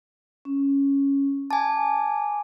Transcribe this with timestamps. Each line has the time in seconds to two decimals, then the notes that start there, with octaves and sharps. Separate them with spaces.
0.45 C#4
1.51 G#5 A5 D6